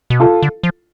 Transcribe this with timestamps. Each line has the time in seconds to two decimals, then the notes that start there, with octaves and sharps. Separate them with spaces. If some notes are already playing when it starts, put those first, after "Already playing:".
0.10 B2
0.20 C3 F4 A4
0.42 D3
0.63 F3